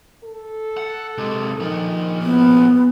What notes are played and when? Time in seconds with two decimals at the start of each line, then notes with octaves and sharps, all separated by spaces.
0.24 A4
0.77 F#5
1.18 C3 G#3
1.60 A#2 D#3 F3
2.22 A2 B3